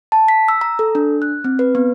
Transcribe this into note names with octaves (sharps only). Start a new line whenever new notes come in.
A5
B6
E6
A#5
A4
D4
F#6
C4
B4
B3